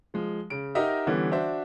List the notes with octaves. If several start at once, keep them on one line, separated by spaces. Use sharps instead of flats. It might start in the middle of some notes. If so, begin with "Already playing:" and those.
F3 G#3
C#3 D7
D#4 G4 A#4 D#5 E5 F#5
D3 E3 G3 B3 C#4
D4 F#4 C5 E5